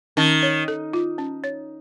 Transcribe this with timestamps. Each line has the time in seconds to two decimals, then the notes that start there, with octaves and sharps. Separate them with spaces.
0.17 D#3 C#4
0.43 C#5
0.68 A4
0.93 F4
1.18 C#4
1.44 C#5